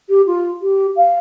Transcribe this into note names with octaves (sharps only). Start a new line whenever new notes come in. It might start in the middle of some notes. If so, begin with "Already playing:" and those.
G4
F4
G4
F5